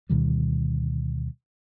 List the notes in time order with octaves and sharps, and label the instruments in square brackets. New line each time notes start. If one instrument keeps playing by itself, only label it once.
[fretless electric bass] D2 B2 D#3 G3